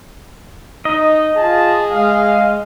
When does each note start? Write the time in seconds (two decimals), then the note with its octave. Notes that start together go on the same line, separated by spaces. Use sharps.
0.85 D#4 D#5
1.36 F4 G#4 A5
1.90 G#3 F5